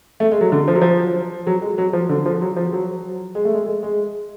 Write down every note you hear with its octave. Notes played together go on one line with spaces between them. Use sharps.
A3
G#3
F#3
D3
F3
F#3
F3
F#3
G#3
F#3
F3
D3
F3
F#3
F3
F#3
G#3
A3
G#3
G#3
G#3